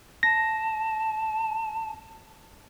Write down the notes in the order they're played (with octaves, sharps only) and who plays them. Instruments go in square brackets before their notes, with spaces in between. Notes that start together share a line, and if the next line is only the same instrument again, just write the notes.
[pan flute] A5 [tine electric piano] A#6